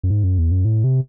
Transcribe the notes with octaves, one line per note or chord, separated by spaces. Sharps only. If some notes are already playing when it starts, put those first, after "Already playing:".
F#2
G#2
F#2
E2
F#2
A2
C3